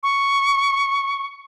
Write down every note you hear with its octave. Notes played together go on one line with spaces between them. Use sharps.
C#6